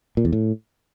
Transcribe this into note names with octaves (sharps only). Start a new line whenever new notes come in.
A#2
E2
A2